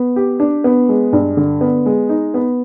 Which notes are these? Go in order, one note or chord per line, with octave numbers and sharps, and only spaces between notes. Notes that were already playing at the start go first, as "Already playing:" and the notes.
Already playing: B3
G4
D4
B3
G#3
G2
D3
B3
G#3
D#4
B3